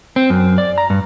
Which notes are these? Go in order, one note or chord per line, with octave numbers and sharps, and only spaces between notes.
C4
F#2
D5
A#5
G2